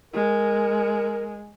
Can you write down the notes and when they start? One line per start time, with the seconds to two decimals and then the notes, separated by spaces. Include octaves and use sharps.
0.14 G#3 A#4